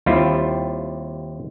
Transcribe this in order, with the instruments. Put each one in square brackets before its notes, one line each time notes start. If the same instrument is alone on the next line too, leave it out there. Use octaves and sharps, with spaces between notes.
[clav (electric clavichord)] D#2 G3 C4 E4 F4